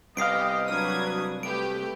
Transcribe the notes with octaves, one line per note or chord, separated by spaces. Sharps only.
C2 B3 G4 D#5 F5 D#6 C7 D7
F#3 D4 B4 D#6 F6 G#6
A3 G4 B4 D7